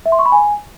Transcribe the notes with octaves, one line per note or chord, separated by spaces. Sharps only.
E5
C6
C#6
B5
G#5